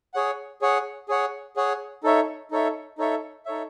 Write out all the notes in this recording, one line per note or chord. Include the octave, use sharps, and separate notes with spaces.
G#4 C#5 F#5
G#4 C#5 F#5
G#4 C#5 F#5
G#4 C#5 F#5
D#4 A4 C#5 E5
D#4 A4 C#5 E5
D#4 A4 C#5 E5
D#4 A4 C#5 E5